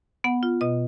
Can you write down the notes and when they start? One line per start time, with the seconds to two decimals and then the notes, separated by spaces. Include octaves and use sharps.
0.24 B3 F#5
0.43 F4
0.61 B2 D#5